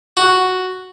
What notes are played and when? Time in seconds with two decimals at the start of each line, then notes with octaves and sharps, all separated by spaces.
0.17 F#4